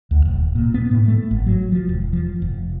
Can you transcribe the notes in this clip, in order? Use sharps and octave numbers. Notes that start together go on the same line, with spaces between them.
D2
D#1
A#2
B3
A2
A3
G#1
F#3
F3
E1
F3
F1